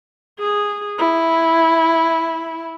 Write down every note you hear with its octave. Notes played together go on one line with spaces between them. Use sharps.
G#4
E4